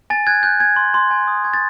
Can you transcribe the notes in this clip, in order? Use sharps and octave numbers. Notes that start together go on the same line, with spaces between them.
G#5 A6
F#6 G#6
F#6 G6
G#5 G#6
C6
C6
G#5
D#6
C#6 G#6
A6